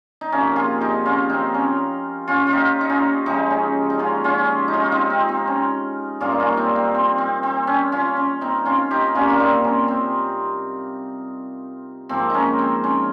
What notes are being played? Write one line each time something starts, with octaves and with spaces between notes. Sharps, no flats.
D#4
C3 F3 A#3 C#4
F4 G#4
D#4 G4
C#4 F4
C4 D#4
C#4
C#4 F4
F4
D#4 G4
D#4
C#4 F4
C#3 F3 G#3 D#4 G4
C#4
D#4
C#4 F4
C#4 F4
D#4
C#4 F4
F4
C4 D#4
C4
C4
C#4
G2 G3 A#3 C#4 F4
D#4
C#4 F4
C4 D#4
C4
C4
C4
C4
C#4
C#4 F4
C#4
C4 D#4
C#4 F4
D#4 G4
C3 G3 A#3 C#4 F4
F4
C4 D#4
C#4
C4
G#2 F3 A#3 C4
C#4 D#4
C4
C#4